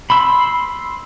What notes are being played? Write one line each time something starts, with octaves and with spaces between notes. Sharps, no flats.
B5 C6 E6